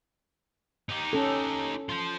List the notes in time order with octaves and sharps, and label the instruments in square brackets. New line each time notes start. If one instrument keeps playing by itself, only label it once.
[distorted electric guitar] D#4 G4
[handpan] C#4 A4
[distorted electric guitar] F4 C5